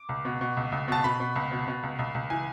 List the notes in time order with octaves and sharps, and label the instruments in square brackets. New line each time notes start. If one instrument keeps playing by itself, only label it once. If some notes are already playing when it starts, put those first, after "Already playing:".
Already playing: [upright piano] D6
C#2
B2
B2
C#2
C#2
B2 A5
B2 B5
B2
C#2
B2
B2
C#2
C#2
C#2
E3 G#5